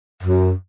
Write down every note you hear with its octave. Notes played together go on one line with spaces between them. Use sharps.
F#2